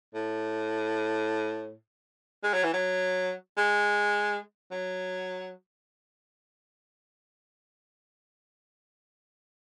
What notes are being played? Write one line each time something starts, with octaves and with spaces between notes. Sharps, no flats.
A2
G#3
F#3
E3
F#3
G#3
F#3